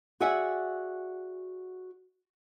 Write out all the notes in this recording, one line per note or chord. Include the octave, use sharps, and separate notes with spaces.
F#4 G#4 D5 E5 F#5 G#5